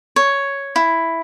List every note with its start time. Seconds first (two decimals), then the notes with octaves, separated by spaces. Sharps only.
0.16 C#5
0.76 E4